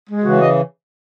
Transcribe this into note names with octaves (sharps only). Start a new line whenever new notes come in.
G#3
C#3 E3 F#4
D#5